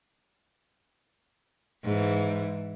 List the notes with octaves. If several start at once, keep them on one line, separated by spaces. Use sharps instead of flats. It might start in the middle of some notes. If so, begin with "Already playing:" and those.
G#2 E3